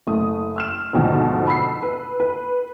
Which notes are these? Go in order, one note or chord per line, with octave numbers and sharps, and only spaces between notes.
F#1 A3 D#6
E6 F6 E7
D2 G#2 B2 F3
B5 E6 C7
B4
B4